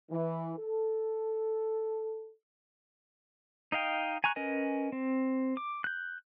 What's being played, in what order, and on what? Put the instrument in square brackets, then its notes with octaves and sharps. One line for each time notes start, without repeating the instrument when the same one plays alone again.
[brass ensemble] E3
A4
[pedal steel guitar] D#4 D#5 F5 G5
G#5 A#5 C#6 F#6
C#4 A#4 B4 D#5 G#5
C4
D6
F#6 G6